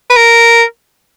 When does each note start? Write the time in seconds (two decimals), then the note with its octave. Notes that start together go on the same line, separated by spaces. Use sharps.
0.10 B4
0.17 A#4